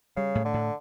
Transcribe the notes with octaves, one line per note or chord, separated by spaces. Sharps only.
C#3 G3
A2
D3
A2